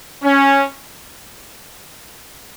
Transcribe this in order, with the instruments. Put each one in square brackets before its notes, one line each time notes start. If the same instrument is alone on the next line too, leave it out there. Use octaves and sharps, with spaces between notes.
[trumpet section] C#4